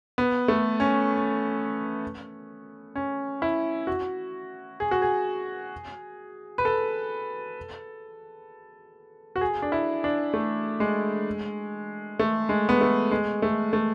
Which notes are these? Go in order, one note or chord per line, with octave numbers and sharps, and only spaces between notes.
B3
A3
C#4
C#4
E4
F#4
G#4
F#4
G#4
B4
A4
F#4
G#4
D4
E4
D4
A3
G#3
A3
G#3
B3
A3
G#3
A3
A3